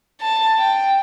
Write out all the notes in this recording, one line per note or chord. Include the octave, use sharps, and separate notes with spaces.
A5
G5